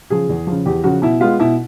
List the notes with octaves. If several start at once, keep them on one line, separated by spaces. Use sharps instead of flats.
C#3 F3 G#4
E2
C#3 F3
E2 G4
C#3 F3 F#4
B2 E4
G#3 B3 F4
B2 E4